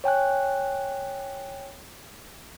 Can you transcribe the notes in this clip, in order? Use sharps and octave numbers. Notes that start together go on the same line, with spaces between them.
C#5 G5 G#5 F#6